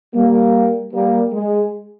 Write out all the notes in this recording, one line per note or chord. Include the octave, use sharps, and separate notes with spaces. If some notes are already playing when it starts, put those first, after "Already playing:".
G3 A#3
G3 A#3
G#3